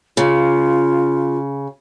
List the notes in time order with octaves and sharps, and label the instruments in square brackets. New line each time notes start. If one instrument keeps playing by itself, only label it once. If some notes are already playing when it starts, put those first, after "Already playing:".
[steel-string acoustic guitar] C#3 [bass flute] F4